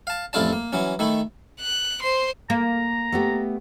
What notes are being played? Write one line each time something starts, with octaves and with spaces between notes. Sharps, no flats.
F5 A5
A1 F2 E4 F4 D5 A5
A#3
E3 F#3 C#4
D#3 A3 E4
F#6
C5 C6
A#3 A#5
A3 B3 G4